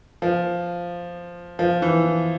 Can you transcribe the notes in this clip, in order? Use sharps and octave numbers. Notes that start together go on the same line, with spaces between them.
F3
F3
E3